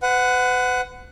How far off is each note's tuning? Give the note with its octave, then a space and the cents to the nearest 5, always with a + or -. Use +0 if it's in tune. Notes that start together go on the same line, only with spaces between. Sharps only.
B4 +40 F#5 +0